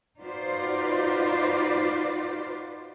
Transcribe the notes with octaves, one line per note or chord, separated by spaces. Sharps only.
D#4 F4 F#4 B4 C5 D5